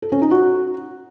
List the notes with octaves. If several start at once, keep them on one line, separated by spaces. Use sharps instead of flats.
A4
C#4
D#4
F#4